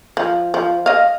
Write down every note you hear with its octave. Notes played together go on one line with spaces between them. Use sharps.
F3
F3
D#5 F5